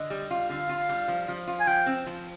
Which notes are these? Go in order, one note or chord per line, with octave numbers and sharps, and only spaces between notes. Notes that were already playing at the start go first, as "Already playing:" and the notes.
Already playing: D3 D#5
G3
F4
D3 F5
F4
G3
F3
F3
F4
G#5
F3 G5
C4
F3